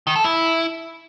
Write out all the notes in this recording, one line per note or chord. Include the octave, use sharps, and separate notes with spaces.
D#3
A4
E4